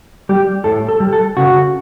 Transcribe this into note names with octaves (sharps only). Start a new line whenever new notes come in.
G3 G4
A2 A4
A4
G3
A4
C#3 F#4